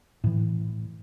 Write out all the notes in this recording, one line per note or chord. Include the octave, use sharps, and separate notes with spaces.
A2 E3